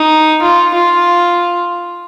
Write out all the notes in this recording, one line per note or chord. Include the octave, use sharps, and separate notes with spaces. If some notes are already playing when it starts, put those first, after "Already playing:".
Already playing: D#4
F4
F4